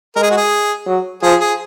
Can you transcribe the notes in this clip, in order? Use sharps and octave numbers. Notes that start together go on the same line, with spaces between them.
G#3 A#4
G#4
F#4
G#4
F#3
F3 G#4
G#4